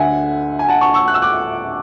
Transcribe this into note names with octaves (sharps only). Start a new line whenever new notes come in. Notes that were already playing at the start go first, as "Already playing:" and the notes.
Already playing: D2 D3 E5 F#5 G#5
G#5
F#5 A5
A5 C#6
C#6 E6
F#6
E6
D6 F#6